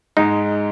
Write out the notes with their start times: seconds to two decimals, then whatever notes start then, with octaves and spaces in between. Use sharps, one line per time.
0.17 G#2 G#3 D#4